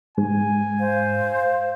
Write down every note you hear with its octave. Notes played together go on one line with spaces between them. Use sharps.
G#2 G#5
C5 F5